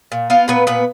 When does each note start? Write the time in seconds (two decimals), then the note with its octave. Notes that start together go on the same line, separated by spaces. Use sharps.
0.12 A#2
0.30 B3 F4 F5
0.48 A#2 B3 B4
0.67 A#2 B3 B4